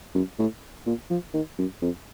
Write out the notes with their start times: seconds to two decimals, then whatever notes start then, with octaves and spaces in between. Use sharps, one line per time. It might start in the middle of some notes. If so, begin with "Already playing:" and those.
0.15 F#2
0.39 A2
0.86 A#2
1.10 F3
1.34 D#3
1.58 F#2
1.82 F2